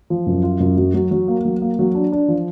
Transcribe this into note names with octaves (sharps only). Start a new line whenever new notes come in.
F3
F#2
F4
F#2
F#3
F#3
F#3
A#3
F#3
A#3
F#3
D4
D4
F3